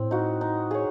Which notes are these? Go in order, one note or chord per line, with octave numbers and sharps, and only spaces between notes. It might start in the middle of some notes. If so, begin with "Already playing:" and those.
Already playing: A2 C4
D#4 F#4
D#4
G#4 C#5